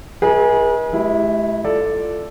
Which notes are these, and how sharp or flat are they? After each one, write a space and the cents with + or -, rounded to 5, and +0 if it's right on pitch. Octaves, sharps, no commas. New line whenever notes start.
D#4 +40 G#4 +0 B4 -45
G#3 +45 E4 +0 G4 +0
F4 +0 A4 +0 D5 +0